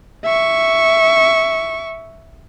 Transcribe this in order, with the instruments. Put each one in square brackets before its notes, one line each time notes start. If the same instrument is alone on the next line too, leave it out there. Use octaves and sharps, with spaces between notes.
[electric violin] E5 C#6